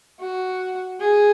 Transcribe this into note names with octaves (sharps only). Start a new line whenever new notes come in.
F#4
G#4